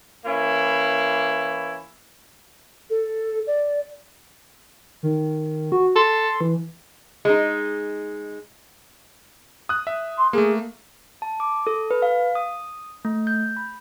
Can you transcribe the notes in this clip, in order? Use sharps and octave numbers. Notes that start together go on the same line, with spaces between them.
E3 A#3 C#4 E4
A4
D5
D#3
F#4
A4 C6
E3
G#3 D#4
D#6 F#6
E5
C6
A3 A#3 G#4
A5
D6
A4
B4
F5
D#6
A3
G6
B5